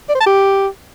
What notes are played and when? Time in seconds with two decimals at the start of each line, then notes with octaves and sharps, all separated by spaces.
0.09 D5
0.15 C5
0.21 A5
0.26 G4